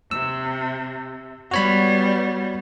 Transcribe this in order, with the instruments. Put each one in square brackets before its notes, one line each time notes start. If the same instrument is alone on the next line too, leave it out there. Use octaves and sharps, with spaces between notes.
[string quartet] C3 [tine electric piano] E6
[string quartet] G3 B3 [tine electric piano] F#4 C#5 B5